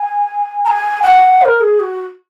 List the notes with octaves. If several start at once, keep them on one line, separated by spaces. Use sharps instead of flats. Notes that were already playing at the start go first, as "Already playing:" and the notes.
Already playing: G#5
A#5
G#5
F#5
C5
A#4
G#4
F#4